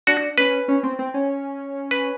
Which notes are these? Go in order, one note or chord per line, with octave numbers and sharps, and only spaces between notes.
D4 F#4
C#4 B4
C#4
C4
C4
C#4
B4